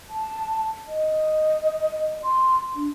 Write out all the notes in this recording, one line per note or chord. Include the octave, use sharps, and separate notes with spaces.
A5
D#5
C6
D4